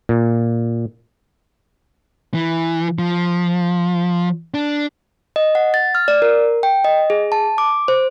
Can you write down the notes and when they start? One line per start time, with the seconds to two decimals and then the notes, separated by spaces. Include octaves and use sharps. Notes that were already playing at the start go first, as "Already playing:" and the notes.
0.09 A#2
2.34 E3
2.99 F3
4.54 D4
5.36 D#5
5.55 F#5
5.74 A6
5.95 F6
6.08 D5
6.22 A#4
6.63 G5
6.84 D#5
7.10 G#4
7.32 A5
7.58 D6
7.88 C5